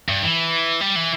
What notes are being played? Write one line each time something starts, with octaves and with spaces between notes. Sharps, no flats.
G2
E3
G3
E3